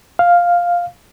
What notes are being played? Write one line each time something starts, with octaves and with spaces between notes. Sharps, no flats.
F5